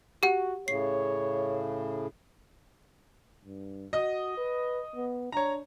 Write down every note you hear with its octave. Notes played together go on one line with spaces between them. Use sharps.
F#4 G4 F#5
A2 C#3 C#5 C7
G2
F#4 D#5 D#6
B4
B3
D4 C#5 A#5